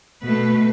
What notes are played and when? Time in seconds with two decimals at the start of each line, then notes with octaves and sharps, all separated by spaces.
0.23 B2 A3 B4